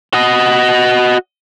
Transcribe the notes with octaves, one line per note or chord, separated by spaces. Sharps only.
F#4 D#5